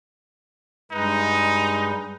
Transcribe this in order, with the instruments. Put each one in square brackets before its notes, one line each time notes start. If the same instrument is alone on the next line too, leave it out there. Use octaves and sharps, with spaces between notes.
[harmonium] G2 G#3 B4 [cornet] D#4